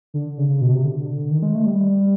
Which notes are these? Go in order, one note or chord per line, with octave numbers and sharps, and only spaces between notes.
D3
C#3
C#3
B2
C3
D3
D#3
G#3
A3
G3